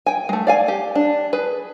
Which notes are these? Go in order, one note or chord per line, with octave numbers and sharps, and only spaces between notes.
G5 G#5
G#3 A3
D5 F5 G#5
G4
D4
G#4 B4